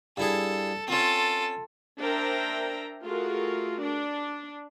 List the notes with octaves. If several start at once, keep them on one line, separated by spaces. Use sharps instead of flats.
G2 E4 G#4 A4
C4 C#4 F4 A4
D4 A#4 C5 E5 G5 A#5
A3 F4 F#4 G#4 A#4
D4